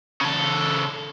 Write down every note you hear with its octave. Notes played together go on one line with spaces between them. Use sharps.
C#3 A4